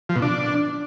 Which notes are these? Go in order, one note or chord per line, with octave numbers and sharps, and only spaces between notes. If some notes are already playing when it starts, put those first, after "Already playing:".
F3
B2
D4